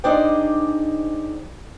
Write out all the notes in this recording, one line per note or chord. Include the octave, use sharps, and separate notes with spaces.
D4 D#4 G#4 C5 D5 G5